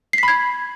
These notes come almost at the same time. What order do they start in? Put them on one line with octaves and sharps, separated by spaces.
C7 B6 B5 G#6